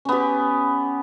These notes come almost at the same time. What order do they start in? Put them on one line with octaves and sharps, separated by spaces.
C#4 B3 G4